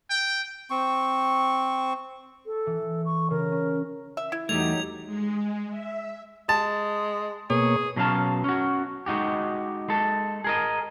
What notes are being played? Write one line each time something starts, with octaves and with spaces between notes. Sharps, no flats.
G5
C4 C#6
A4
E3
C#6
C#3 A#4
C#4
E5
E4
E2 F#3 G3 A3 D#4 G4 G#6 F7
G#3
E5
G#3 A5
B2 A#3 G#4 C#5
B2 F#3 C#4 F5 A5
C#4 F#4
G#3 D#4 F#4 G4
G#3 A4
G#4 A#4 D#5